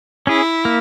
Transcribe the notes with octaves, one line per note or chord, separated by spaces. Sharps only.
C#4 E4 G#4
A#3